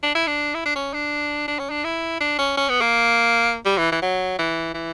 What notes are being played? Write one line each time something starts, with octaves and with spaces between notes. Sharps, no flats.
D4
E4
D4
E4
D4
C#4
D4
D4
C#4
D4
E4
D4
C#4
C#4
B3
A#3
G3
E3
E3
F#3
E3
E3